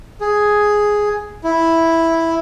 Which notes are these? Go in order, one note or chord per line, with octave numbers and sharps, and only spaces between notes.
G#4
E4